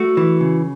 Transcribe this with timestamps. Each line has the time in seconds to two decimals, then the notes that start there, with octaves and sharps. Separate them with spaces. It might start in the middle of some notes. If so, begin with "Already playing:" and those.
Already playing: A3 F#4
0.17 E3
0.40 C#3